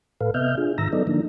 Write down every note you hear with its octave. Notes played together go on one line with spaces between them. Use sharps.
A2 A4 B4 F5
C3 B3 D#5 E5 F6 G6
D4 F4 G#4
G#2 D#3 A#5 E6 A#6
F#3 B3 D#4 A4 D5 D#5
D3 F3 A#3 D4 D#4